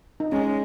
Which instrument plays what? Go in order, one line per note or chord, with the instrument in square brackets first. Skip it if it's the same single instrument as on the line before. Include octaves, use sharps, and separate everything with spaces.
[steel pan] D#4
[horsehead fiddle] G#3 [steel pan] C#4